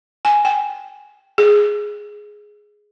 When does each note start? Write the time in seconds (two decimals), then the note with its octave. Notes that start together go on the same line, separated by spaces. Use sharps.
0.25 G#5
0.45 G5
1.38 G#4